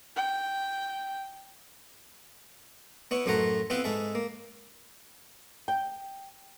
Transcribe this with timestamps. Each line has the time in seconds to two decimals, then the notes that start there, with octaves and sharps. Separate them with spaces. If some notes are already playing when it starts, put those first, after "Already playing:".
0.16 G5
3.11 B3 E4 C#5
3.26 F#2 A2 A3 C5 F#5 A#5
3.70 B3 C4 E4 F4 B4 C5
3.84 G#2 G#4 A4 E5
4.15 A#3
5.68 G5